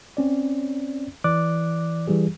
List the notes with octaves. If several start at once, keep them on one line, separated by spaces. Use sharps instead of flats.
C4 C#4 D5
E3 D5 D6 F#6
E3 G3 G4 G#4